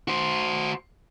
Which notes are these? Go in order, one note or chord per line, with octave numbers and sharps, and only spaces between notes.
F#4 C5